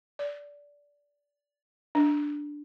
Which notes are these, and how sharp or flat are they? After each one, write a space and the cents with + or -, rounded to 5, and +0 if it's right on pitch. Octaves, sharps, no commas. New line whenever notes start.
D5 -20
D4 +0